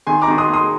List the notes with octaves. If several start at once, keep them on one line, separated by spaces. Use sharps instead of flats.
D#3 G#5 C6
A#5 D6
D#3
C6 D#6
A#3
C6 D#6